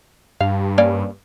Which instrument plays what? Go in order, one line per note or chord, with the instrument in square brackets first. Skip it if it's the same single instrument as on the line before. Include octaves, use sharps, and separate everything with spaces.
[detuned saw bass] G2 [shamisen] F5
[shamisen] A#3 C#4 D5